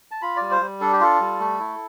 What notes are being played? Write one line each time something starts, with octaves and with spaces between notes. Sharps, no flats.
A5
F4 B5
G3 D5
C5
G3
D4 A4
G4
F4 A4
G3
A3
E4